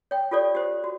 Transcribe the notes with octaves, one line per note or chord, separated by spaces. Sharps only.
C#5 G5
F4 G4 A4 C#5 D5
G4 C5
F#4